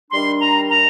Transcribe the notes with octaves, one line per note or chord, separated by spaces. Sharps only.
D#3 G3 D4 C6
A#5
A#5